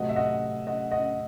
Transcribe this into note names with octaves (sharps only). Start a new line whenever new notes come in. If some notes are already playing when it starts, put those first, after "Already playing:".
Already playing: C3 F#3 A3 C4 D#5 F#5
E5
D#5 F#5
D#5 F#5
D#5 F#5